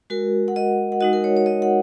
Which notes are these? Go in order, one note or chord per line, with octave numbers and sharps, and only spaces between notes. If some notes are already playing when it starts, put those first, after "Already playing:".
G#3 F#4 A#4
F#5
D#5
F#5
G#3 D#4 F#4 D#5
A#4
C#5
C#5
D#5
F#5